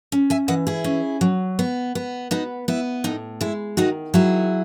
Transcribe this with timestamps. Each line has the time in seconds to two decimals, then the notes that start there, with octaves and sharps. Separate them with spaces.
0.12 C#4
0.30 E5 G#5
0.48 E3 D#5 F#5
0.67 E4 G#4
0.84 C#4
1.21 F#3
1.59 B3
1.95 B3
2.31 B3 D#4 F#4
2.68 B3 E4
3.04 A2 D#4
3.41 G#3 E4
3.77 D#3 D#4 F#4
4.14 F#3 E4 G#4